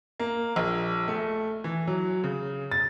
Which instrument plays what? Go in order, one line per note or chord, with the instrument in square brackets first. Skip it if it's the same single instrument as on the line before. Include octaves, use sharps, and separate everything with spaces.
[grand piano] A#3
A#1
A3
E3
F#3
C#3
A6